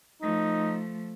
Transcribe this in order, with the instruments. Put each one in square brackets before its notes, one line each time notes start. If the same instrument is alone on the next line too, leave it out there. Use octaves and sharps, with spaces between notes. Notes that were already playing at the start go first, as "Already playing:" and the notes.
[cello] F3 A3 [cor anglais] D#4